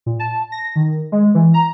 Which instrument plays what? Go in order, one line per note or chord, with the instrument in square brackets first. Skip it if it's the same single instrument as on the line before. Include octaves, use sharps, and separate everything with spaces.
[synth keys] A#2
A5
A#6
D#3
G#3
E3
A#5